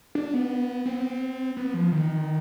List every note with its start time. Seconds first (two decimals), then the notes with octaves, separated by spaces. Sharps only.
0.15 D4
0.34 B3
0.86 C4
0.93 B3
1.01 C4
1.57 B3
1.74 F3
1.92 D#3